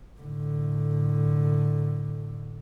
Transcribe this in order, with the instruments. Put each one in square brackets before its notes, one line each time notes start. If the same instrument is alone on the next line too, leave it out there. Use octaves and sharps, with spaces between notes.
[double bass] A2 D3